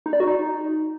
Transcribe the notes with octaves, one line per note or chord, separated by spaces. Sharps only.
D#4
D5
F#4
D#4